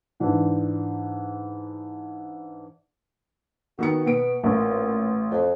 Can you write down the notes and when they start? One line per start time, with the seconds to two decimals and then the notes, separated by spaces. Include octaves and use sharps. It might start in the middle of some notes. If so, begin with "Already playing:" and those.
0.20 G#2 E3 D4
3.79 D#3 B3 F#4 C#7
4.05 B2 B3 D7
4.44 A1 A#2
5.31 F2